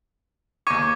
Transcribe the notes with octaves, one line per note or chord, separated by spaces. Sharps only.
D#2 C#6 D6 G#6 D#7